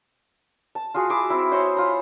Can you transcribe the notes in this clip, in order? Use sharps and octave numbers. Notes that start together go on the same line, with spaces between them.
A5
F4 F#4 G#4
E4 G#4 E5 D6
C4 E4
C5 C#5 D#5 E5
E4 F4 A#5